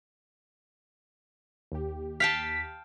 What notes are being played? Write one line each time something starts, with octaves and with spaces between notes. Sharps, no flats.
D#2 G4
F5 G5 A5 B6